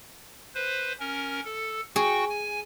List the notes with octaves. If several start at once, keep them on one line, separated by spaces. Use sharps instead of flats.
B4 C5
C#4 A#4
A4
F#4 G#4 G5 C#6
G#5